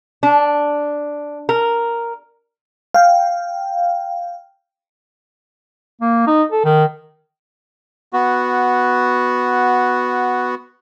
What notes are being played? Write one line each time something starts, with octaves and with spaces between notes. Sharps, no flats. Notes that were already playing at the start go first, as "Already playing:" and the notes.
D4
A#4
F5 G5
A#3
D#4
A4
D#3
B3 F#4